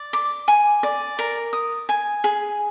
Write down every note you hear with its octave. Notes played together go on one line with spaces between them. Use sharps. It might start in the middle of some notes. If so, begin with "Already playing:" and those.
Already playing: D5
D6
G#5
D5
A#4
D#6
G#5
G#4